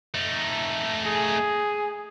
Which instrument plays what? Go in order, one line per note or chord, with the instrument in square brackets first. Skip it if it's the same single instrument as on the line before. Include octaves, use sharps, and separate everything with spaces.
[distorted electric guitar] A3 D#4
[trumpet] G#4